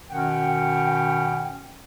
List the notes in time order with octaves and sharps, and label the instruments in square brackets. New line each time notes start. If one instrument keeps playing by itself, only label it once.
[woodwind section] B2 D#3 C#4 F#5 G5